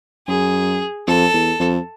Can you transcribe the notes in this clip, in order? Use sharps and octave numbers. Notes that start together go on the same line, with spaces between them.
F#2 G#4
F2 A4
E2
F2